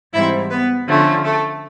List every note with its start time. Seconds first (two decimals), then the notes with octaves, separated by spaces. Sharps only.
0.13 G#2 E3 G3 C4 E4 E5
0.50 B3 B4
0.87 D3 F3 A3 C#4
1.24 A3 A4